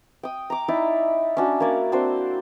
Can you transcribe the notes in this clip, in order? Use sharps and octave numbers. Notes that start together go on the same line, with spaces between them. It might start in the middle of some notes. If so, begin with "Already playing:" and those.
G5 D#6
A#5 D6
D#4 E4 D5
C#4 D4 F#4
A#3 A#4 C#5 D5
C4 D4 F#4 C5